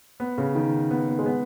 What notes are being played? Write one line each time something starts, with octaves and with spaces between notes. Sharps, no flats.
B3
C#3
D#3
B3
B3
G#3
B3